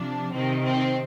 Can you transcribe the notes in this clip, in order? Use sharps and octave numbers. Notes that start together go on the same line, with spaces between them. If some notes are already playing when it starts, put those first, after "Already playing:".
Already playing: C3 F3 D4
C3 D#3 C4
C4